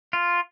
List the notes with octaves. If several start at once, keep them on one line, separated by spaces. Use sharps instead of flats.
F4